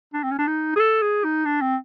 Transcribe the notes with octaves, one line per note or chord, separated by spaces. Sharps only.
D4
C4
C#4
D4
D#4
G#4
A4
G#4
D#4
D4
C4